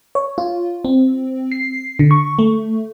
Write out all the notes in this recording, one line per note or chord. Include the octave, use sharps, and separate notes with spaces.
C#5
F4
C4
C7
D3
C#6
A3